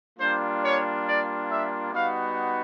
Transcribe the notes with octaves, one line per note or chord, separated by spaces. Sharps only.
G3 A#3 D4 F4 C5
C#5
D5
E5
G3 B3 D#4 F#4 F5